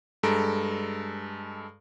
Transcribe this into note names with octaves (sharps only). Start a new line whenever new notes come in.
G2 G#3 A4 A#5 D7